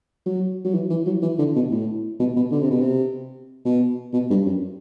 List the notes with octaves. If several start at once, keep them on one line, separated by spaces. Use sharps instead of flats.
F#3
F#3
E3
E3
F#3
E3
D3
B2
A2
B2
B2
D3
C3
B2
C3
B2
B2
G2
F#2